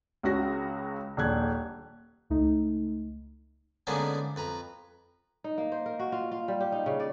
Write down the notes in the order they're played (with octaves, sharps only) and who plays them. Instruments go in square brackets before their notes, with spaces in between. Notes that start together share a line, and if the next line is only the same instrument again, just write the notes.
[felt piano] C#2 C#3 F#4 A#6
D#1 A#1 F#6 G#6
[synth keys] C#2 A3 D#4
[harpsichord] G#2 D3 A#3 B3 C#4 D4
F2 B4 A#5
[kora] D#4
A#3
C5
A#4
F#4
F4
F4
G3
G4
D#4
C#3
D5